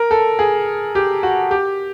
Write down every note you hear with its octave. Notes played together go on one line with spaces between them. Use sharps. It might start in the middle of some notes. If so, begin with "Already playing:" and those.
Already playing: A#4
A4
G#4
G4
F#4
G4